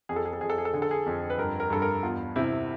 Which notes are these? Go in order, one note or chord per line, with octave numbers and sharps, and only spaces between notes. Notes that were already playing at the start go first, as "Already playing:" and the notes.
F2 G#4
A4
G#4
A4
F2 G#4
A4
G#4
A4
D3 G#4
A4
G#4
F2
B4
G2 A#4
A#4
G2 A4
A#4
E2 F4
C3 E4